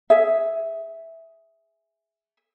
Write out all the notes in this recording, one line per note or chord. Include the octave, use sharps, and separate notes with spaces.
G#4 E5